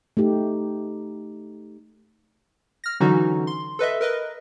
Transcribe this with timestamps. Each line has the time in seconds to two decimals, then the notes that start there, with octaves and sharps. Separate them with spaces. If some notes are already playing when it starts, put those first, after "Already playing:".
0.17 A3 D#4 G4
2.84 F6 A#6
3.00 D3 E3 F#3 C#4 D#4 F#4
3.47 C6
3.79 A4 B4 D#5 E5
4.01 A#4 B4 D#5